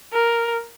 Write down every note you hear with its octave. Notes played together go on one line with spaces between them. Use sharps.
A#4